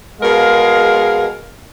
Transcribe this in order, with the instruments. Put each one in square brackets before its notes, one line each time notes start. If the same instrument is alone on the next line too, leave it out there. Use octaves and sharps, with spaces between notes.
[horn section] B2 G#3 G#4 A#4 F5